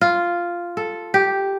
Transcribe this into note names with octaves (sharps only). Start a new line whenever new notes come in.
F4
A4
G4